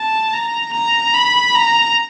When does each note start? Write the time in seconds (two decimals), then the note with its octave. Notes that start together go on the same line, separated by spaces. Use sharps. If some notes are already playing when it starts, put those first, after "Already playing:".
Already playing: A5
0.34 A#5
0.74 A#5
1.14 B5
1.55 A#5